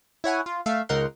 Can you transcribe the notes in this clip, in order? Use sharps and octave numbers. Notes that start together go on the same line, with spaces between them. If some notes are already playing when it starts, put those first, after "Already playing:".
E4 C#5 F#5 G#5
F4
A3 E5 F5
C#2 D#4 A#4 F#5 C6